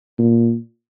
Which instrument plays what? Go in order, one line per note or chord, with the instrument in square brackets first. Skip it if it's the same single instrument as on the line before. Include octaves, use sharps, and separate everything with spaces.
[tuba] A#2